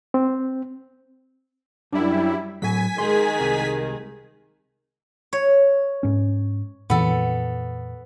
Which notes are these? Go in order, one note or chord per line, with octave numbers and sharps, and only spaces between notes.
C4
F#2 G3 D4 E4
A2 F#3 G#5 B6
D#3 G#3 G#4 C6
C2
C#5
G#2 C#4
F2 A#2 E3 B3 A4